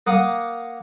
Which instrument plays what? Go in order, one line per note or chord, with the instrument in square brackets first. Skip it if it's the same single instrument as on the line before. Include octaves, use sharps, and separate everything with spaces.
[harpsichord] A#3 F#5 D#6